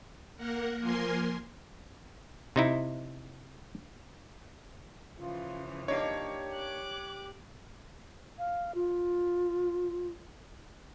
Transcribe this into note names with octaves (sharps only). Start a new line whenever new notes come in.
A#3 A#4 F#5
F3 A#3 A#4 G#5 C6
C3 D#4 E4
C#3 E3 F3 F4
A#3 D4 D#4 G4 C#5
D6 F#6
F5
F4